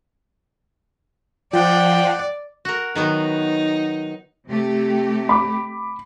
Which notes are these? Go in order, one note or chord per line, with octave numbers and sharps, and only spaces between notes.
F3 D5 F#5 G5
F#4 A#4
D#3 F#3 B3 D#4
C3 A3 G4
B5 D6